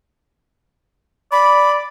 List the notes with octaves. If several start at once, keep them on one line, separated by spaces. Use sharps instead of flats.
D5 B5